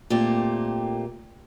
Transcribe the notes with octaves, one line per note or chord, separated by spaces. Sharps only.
A#2 A3 A#3 C4 G4